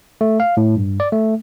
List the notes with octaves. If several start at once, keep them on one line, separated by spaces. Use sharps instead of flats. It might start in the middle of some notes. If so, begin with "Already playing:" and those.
A3
F5
A2
G2
D5
A3